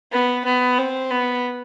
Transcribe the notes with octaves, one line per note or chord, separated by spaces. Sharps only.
B3
B3
C4
B3